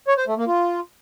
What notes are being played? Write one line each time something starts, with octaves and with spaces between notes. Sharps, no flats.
C#5
C5
A3
A#3
F4